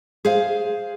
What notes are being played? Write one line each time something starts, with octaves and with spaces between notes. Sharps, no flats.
G#4 C5 F5